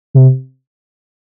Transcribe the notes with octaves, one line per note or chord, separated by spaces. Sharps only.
C3